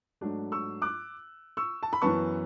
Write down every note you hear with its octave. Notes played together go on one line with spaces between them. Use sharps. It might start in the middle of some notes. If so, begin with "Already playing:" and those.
G#2 F#3 A3 D4
C#6 E6
D6 F#6
C#6 E6
A5
B5
F#2 E3 B3 A5 C#6